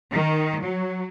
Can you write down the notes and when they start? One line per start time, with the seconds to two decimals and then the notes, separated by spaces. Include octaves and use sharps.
0.12 D#3
0.61 F#3